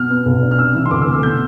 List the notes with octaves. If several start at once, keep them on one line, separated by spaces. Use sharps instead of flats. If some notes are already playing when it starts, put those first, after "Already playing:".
Already playing: B2 F6
B3
B1
D4
F6
C3 E6
E3
C6
D2 D6
E6
A3
E6
B2 G6